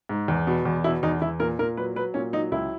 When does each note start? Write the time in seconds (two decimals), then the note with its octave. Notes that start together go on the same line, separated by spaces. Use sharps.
0.09 G#2
0.28 E2
0.47 B2
0.65 E2
0.84 B2 E4
1.03 E2 D#4
1.21 E2 E4
1.40 A#2 A#4
1.59 A#2 A#4
1.77 F#3 B4
1.96 F#3 B4
2.14 A#2 C#4
2.33 F#3 D#4
2.52 C#2 E4